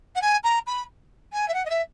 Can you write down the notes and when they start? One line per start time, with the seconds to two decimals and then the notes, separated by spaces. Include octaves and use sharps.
0.15 F#5
0.21 G#5
0.43 A#5
0.66 B5
1.32 G#5
1.48 E5
1.54 F#5
1.65 D#5
1.70 E5